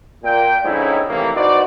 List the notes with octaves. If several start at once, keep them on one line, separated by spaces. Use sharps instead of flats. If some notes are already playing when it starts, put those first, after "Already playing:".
A#2 G5
G#2 D3 F3 C#4 D#4 E4
A2 C3 D#3 E3 A#3
D#4 F#4 B4 C5 D5